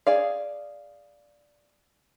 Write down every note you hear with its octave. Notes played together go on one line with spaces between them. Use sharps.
G#4 D5 F5